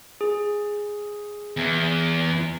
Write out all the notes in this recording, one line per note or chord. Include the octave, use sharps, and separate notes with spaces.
G#4
E2